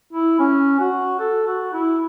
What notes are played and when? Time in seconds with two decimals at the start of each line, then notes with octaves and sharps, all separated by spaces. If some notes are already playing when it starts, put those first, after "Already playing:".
0.13 E4
0.39 C#4
0.79 F#4
1.20 A4
1.47 F#4
1.73 E4